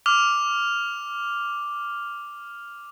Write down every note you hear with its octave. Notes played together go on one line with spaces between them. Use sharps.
D6 F6 F7